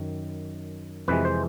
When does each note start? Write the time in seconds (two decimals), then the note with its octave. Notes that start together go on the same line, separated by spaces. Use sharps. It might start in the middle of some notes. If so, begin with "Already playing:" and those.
Already playing: F#2 D#3
1.08 F2 C3 E3 G#3 B4
1.25 C5